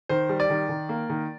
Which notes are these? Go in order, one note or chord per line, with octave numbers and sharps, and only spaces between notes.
D#3 C5
G3
D5
D#3
D#3
A#3
D#3